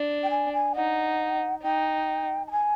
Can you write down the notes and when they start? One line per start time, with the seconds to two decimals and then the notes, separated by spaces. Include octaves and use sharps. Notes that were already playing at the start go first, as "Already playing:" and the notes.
Already playing: D4
0.23 G5
0.30 G#5
0.53 G#5
0.75 D#4 F#5
1.63 D#4 G5
2.48 A5
2.51 G#5